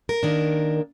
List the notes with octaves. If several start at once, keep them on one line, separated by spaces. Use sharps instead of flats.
A#4
D#3 A#3 D4